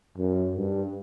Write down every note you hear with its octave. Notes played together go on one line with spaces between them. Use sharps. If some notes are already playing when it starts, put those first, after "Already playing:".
F#2
G2